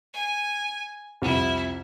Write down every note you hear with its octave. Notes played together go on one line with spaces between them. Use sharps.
G#5
C2 F2 E4